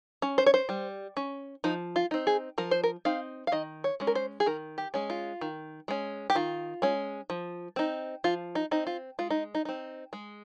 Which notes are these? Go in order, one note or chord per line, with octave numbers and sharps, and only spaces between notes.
C#4
C5
C#5
C5
G3
C#4
F3 D#4
F4
C4 D#4
G#4
F3 A#4
C5
A#4
C4 D#4 F5
F5
D#3 D#5
C#5
G#3 C#4
A#4
C5
G#4
D#3 A#4
G4
G#3 C#4
F4
D#3
G#3 C#4
G4
D#3 F4
G#3 C#4
F3
C4 D#4
F3 F4
D#4
C4 D#4
F4
G#3 F4
D#4
D#4
C4 D#4
G#3